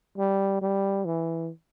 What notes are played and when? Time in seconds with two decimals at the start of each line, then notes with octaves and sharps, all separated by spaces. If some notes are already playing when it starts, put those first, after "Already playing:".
0.17 G3
0.61 G3
1.05 E3